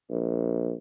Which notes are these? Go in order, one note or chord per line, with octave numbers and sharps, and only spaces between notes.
A#1